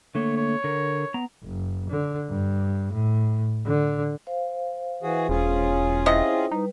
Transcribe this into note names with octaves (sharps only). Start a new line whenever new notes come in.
D3 A3 A#3 C#5
C#5
D3 A#4
B3 A#5
F#1
D3
G2
A2
D3
C5 F5
E3 F#4 G#4
E1 C#4 F4 G#4
C3 E4 C5 D#5 G5
G3 D#4 B4